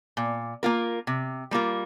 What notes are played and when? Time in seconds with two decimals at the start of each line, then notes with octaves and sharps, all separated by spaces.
0.17 A#2
0.63 A#3 F4 A#4
1.07 C3
1.51 G3 A#3 F4 A#4